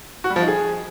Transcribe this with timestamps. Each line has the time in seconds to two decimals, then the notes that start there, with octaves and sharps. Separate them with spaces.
0.24 F#4
0.30 G3
0.36 F3
0.42 D#4
0.48 G#4